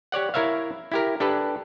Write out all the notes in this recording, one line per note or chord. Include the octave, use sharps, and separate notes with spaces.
G4 C#5 D5 F#5
E4 A#4 C#5 E5 F5
E4 G4 A#4
D4 G4 A4 B4